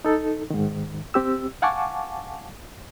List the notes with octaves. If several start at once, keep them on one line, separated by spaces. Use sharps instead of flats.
D#4 A4
G#2 D#3
C4 G4 E6
F5 F#5 G#5 A5 C#6 D6